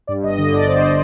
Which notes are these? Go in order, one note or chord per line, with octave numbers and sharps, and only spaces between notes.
G2 D5
G1 D#5
D3 D#5
G1 D5
G2 C5